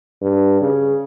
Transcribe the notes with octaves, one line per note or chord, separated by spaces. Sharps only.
G2
C#3